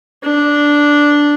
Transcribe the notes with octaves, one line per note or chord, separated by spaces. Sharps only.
D4